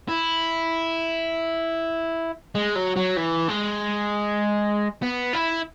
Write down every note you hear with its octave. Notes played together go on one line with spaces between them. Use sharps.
E4
G#3
F#3
F#3
E3
G#3
B3
E4